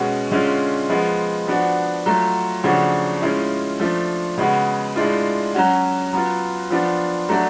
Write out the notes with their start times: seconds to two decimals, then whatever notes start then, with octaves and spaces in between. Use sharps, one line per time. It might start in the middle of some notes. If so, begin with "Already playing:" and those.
Already playing: B2 G#3 C#4 F#4
0.31 D3 G#3 C#4 F4
0.90 F3 G#3 B3 F4
1.48 F3 B3 D4 F#4
2.06 F#3 A3 F4
2.64 C#3 F3 A3 D4 F#4
3.22 A2 G#3 C#4 F4
3.80 F3 A3 D4 F4
4.38 C#3 G#3 B3 F#4
4.96 A2 G#3 D4 F4
5.54 F#3 C#4 F#4
6.13 F#3 B3 F4
6.70 F3 B3 D4 F4
7.29 F#3 A3 D4 F#4